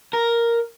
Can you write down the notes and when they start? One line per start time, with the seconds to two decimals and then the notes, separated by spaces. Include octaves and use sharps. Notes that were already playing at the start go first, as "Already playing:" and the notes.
0.13 A#4